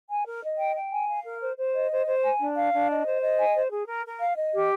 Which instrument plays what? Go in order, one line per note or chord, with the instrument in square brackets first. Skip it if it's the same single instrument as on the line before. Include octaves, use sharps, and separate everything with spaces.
[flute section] G#5
A#4
D#5
G5
G5
G#5
F5
A#4
C5
C5
D#5
C5
C5
G#5
D4
F5
D4
D#5
C5
D#5
G#5
C5
G#4
A#4
A#4
F5
D#5
G4